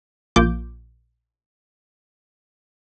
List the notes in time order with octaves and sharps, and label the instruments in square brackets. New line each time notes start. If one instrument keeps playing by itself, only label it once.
[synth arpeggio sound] A#1 A#3 F4 D6 G6